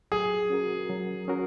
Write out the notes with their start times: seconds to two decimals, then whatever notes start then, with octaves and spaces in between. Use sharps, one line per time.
0.12 F#3 G#4
0.50 C#4 F#4 A#4
0.89 F#3
1.28 C#4 F#4 A#4